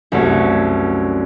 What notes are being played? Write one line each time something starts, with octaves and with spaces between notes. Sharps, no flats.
C2 F#2 A3 F#4 C#5